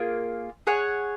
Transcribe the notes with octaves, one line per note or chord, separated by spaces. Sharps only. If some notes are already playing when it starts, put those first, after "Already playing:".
Already playing: A#3 F4 G#4
G#4 C#5 F#5